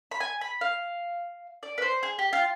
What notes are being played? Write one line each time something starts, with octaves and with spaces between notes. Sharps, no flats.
B5
G#5
B5
F5
D5
B4
C5
G#4
G4
F4